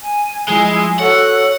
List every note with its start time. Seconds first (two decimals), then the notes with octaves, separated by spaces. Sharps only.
0.01 G#5
0.49 F3 G#3 E4 G#5
0.99 F#4 A4 C#5 F#5